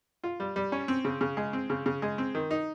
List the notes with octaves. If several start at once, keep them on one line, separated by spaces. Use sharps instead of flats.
F4
G3
G3
C#4
C4
C#3
C#3
G#3
C4
C#3
C#3
G#3
C4
D#3
D#4